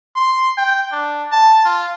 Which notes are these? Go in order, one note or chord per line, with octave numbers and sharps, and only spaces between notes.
C6
G5
D4
A5
F4